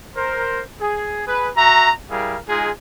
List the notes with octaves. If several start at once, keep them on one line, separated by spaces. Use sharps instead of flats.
A#4 C5
G#4
G#4 B4
F#4 E5 A#5
G3 E4 G#4 A#4 F5
G#3 D#4 F4 G#4